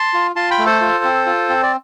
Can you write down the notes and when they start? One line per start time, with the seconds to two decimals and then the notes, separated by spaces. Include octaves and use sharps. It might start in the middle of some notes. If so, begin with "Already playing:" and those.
Already playing: A5 C6
0.14 F4
0.36 F4 A5 C6
0.51 G5 B5
0.59 A3
0.66 A4 C5
0.81 F4
1.04 C4
1.26 F4
1.49 C4
1.63 D5